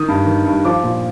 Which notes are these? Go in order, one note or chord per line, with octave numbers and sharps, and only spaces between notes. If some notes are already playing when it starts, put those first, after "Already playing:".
Already playing: D#3 D#6
G2
D#3
G2
F3 D6
A#2